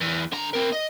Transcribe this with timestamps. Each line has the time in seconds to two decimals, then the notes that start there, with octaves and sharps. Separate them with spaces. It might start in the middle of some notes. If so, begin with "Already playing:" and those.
0.01 E2 E3
0.32 D3 A#5
0.53 C4 A#4
0.72 D#5